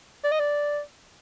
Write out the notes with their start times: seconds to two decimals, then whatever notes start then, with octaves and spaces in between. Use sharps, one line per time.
0.24 D5
0.32 D#5
0.40 D5